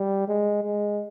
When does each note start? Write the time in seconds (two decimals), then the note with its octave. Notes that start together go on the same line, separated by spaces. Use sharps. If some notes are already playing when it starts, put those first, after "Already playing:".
Already playing: G3
0.28 G#3
0.63 G#3